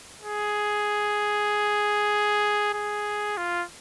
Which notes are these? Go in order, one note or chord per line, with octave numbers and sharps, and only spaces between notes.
G#4
G#4
F4